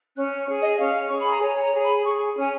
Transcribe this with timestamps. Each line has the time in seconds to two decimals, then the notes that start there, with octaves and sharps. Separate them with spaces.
0.15 C#4 F#6
0.47 G#4
0.62 D#5
0.78 C#4 F5
1.09 G#4 C#6
1.20 B5
1.31 A#5
1.42 C#5 G#5
1.63 A#5
1.73 G#4
1.85 B5
2.05 G#4 C#6
2.37 C#4 G#5